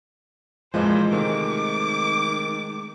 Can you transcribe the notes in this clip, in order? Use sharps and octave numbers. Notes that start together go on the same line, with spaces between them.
F2 A#2 E3 F3 G#3 C5 D#5
C3 D#3 A3 D6